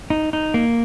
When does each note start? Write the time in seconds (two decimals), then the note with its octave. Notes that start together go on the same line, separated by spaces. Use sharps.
0.10 D#4
0.33 D#4
0.54 A#3